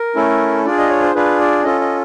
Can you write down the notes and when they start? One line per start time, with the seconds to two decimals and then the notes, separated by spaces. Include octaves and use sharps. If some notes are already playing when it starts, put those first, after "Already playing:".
Already playing: A#4
0.16 A3 C#4 E4 A4
0.65 D4 F4 G#4 D5
0.78 D#5
0.90 C#5
1.03 C5
1.15 D4 F4 G#4 B4
1.40 D5
1.64 C#4 F4 A4 D#5
1.81 D#5